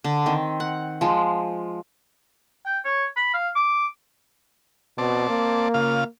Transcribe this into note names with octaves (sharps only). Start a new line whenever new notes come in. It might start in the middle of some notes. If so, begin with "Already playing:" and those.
D3
D#3 C4
F#5
F3 G#3
G5
C#5
B5
F5
D6
B2 C4 D5 A5
A#3
C#3 F4 F5